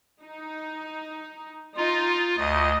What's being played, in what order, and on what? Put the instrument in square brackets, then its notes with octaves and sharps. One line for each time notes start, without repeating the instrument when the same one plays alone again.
[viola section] D#4
[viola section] D#4 A#5 [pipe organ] F4
[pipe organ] D2 [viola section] D#5